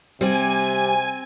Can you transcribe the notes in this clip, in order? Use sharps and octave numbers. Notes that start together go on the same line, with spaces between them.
C3 G3 C4 D5 G#5